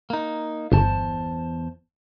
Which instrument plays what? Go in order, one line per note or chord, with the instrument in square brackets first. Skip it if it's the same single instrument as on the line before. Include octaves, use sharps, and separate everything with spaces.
[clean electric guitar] A#3 D#4
[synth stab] G1 [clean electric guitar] E2 C5 A5